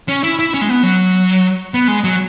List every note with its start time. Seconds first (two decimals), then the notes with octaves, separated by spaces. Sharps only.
0.09 C#4
0.24 E4
0.39 E4
0.54 C#4
0.61 G#3
0.69 B3
0.83 F#3
1.74 B3
1.88 G#3
2.04 F#3